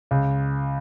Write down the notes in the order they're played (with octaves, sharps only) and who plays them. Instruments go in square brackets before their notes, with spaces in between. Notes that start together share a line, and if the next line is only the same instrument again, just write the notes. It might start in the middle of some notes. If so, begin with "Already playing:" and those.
[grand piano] C#2